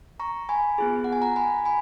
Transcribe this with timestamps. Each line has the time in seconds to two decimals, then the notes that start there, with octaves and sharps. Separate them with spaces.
0.20 A#5 C#6
0.49 G#5 B5
0.78 B3 F4 G#4
1.04 F#5
1.13 G#5
1.22 F#5 A#5
1.36 G#5 B5
1.65 G#5 B5